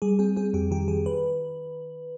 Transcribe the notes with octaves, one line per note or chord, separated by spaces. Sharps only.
G3 G#4
C4 G#4
C4 G#4
F2 G4
D#3 G4
D#3 G#4
B4